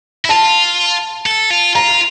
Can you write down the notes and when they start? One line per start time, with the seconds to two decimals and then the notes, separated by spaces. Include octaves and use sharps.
0.25 E4
0.29 F4 A5
1.26 A4
1.50 F4
1.75 F4 A#5